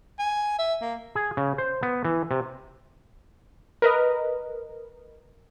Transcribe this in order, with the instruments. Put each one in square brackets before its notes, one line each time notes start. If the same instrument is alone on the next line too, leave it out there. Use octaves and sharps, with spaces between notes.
[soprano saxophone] G#5
E5
A#3
[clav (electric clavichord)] G#4
C#3
C5
B3
E3
C3
[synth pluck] A#4 B4 D#5